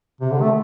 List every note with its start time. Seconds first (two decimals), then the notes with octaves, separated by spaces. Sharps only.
0.21 C3
0.31 D3
0.41 A3